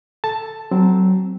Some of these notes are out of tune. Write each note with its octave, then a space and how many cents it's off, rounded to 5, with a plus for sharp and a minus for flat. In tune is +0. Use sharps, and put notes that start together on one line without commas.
A4 +0 A5 +5
F#3 +20 C4 +0